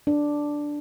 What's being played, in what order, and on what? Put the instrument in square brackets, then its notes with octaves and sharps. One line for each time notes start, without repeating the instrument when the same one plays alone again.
[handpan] D4